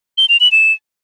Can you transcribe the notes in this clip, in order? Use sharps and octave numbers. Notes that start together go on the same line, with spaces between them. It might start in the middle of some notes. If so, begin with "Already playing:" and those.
G7
F7
F#7
E7